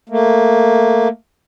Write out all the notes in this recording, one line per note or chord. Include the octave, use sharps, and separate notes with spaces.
A3 A#3